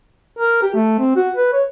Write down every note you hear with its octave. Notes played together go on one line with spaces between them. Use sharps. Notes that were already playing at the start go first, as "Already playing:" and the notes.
A#4
G4
A3
C4
F#4
B4
C#5